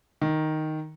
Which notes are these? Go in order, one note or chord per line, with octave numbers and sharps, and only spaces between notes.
D#3